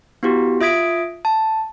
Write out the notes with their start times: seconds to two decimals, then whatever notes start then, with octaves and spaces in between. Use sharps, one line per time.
0.23 B3 E4 F#4 G4
0.61 F4 E5 D#6 G#6 B6 D7
1.25 A5